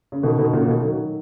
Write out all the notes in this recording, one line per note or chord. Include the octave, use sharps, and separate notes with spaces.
C#3
B2 D#3
B2 D#3
A#2 C#3
B2 D#3
D#3 F#3